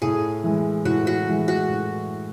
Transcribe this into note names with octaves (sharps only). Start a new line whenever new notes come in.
A2 G#4
E3 G#3
A2 F#4
F#4
E3 G#3
F#4
A2